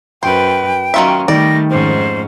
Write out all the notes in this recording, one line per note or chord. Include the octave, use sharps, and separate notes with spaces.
F#2 B4 C5 G5
D#3 F#3 C#4 F4 E5
D#3 G3 A3 D5 A#6
F2 G#2 C#4 C5